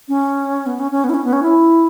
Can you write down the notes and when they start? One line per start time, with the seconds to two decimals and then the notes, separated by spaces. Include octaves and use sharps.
0.08 C#4
0.66 B3
0.79 C#4
0.91 C#4
1.04 B3
1.09 E4
1.14 C#4
1.24 B3
1.33 C#4
1.42 E4